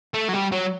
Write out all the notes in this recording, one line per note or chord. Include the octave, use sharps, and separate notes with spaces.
A3
F#3
G3
F#3